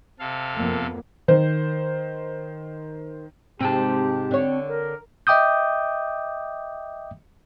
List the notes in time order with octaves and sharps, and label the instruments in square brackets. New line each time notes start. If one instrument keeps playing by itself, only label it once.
[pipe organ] C3 A4 F5
[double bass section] F2 A#3 B3
[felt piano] D#3 C5
[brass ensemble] G#2 G4 [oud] C3 G#3 [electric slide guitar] C4 G5 A5
[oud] D3 C#5
[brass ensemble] A#4
[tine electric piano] D#5 E5 G5 D6 D#6 G6